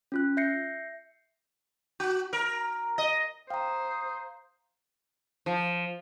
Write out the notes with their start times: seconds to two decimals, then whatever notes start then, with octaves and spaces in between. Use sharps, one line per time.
0.12 C#4 F4 F#6
0.37 E5 G6 A#6 C7 C#7
2.00 F#4
2.33 A#4
2.98 D#5
3.50 C5 F5 G5 A#5 D#6
5.46 F3